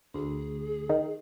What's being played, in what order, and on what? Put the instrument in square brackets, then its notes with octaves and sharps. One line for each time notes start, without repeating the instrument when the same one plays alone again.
[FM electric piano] D2 [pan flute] G#4
[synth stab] D#3